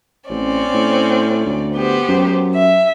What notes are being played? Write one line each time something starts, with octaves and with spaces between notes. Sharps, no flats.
A1 C4 C#4 D5
A2
D2
B3 G4 C5
F#2
E5